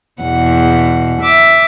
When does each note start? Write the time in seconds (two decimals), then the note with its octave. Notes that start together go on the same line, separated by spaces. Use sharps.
0.20 E2 B2 F#5
1.22 E5 D6